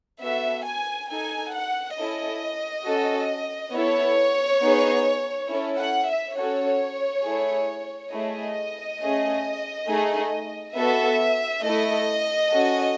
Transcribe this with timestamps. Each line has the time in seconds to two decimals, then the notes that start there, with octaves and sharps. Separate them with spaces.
0.22 B3 F#4 A4 E5
0.65 G#5
1.10 D#4 A4 G#5
1.54 F#5
1.97 C#4 E4 A4 D#5
2.86 C#4 F#4 A4
3.73 B3 E4 A4 C#5
4.61 B3 D#4 G#4
5.49 C#4 E4 A4
5.78 F#5
6.08 E5
6.36 C#4 F#4 A4 C#5
7.24 A3 E4 G#4
8.12 A3 E4 G#4 D#5
9.00 A3 C#4 G#4
9.88 A3 D#4 G#4
10.75 B3 F#4 A4 E5
11.63 A3 E4 A4 D#5
12.52 C#4 F#4 A4